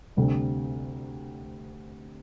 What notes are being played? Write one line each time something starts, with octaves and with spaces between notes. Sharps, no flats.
D2 C3 G3 D4